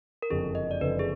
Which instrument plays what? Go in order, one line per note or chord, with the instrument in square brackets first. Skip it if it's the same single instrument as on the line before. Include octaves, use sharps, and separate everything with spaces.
[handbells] A#4
[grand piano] F#1 F2 D3 [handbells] G#4
[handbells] D#5
D5
[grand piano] F#1 F2 D3 [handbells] B4
[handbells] G#4